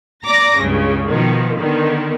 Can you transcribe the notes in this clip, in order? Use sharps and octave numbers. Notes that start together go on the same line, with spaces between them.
D5 A#5 D6 A#6
C#2 G2 C#3
B2 D#3 F3
D3 D#3 B3